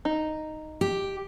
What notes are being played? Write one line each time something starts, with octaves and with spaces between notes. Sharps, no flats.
D#4
G4